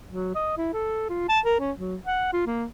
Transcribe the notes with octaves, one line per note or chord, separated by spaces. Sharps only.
F#3
D#5
E4
A4
F4
A5
A#4
C#4
F#3
F#5
F4
A#3